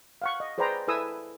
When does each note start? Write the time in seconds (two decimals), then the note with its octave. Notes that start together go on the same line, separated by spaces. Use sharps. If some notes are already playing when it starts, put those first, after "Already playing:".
0.22 F5 F#5 C#6
0.40 D#5
0.58 G#4 B4 C5 D5 G5 A#5
0.88 E4 A4 B4 G#5 D#6 E6